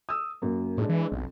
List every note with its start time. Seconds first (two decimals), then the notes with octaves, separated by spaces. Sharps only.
0.09 D#6 E6
0.42 F#2 A#3
0.78 A2 G#3 D4
0.89 E3
1.12 B1 F2